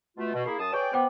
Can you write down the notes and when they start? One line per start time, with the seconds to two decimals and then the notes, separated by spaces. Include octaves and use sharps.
0.17 B2 A3 F4
0.34 B2
0.46 A#3 E4 G#4 C7
0.59 F#2 A5 D#6
0.72 G#4 B4 C#5 D5 G5 C#6
0.93 B3 C5 G5 D6